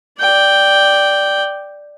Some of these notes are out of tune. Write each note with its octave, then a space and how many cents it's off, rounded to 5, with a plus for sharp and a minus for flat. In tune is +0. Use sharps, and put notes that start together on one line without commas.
D5 +0 G5 +0